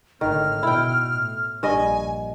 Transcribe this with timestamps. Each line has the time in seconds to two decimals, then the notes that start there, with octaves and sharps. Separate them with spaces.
0.21 G#1 A2 D3 D#3 F6
0.63 B2 E4 G5
1.10 A2
1.63 A#1 G2 D#5 G#5